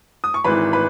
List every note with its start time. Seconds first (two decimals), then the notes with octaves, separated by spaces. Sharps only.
0.24 D#6
0.34 C#6
0.44 G#1 G#2 E3 B4 B5
0.73 B4 B5